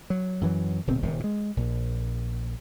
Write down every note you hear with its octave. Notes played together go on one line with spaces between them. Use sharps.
F#3
F#2 E3 F#3
D1 B2 C4
D#1 D#2 C3
B2 G#3
A#1